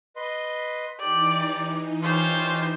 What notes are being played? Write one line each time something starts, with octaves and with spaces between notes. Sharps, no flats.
B4 D#5 C6
E3 D#4 G4 D5
C#4 F4 G4 C5 C6